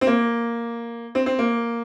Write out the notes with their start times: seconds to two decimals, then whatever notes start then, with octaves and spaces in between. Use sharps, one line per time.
0.01 C4
0.07 A#3
1.15 C4
1.26 C4
1.38 A#3